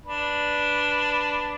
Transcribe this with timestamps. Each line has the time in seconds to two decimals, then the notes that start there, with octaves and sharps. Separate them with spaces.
0.06 D4 B4